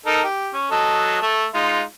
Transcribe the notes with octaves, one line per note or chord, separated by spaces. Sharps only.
D#4 A4 A#4
G4
C#4
F#3 A4 D#5
A3 E5
G#3 D#4 F4